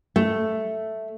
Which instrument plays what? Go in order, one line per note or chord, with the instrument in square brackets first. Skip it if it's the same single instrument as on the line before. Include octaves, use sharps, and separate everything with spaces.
[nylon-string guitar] A3